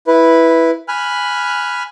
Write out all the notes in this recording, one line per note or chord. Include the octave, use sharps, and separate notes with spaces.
E4 B4
G#5 B5 F6 F#6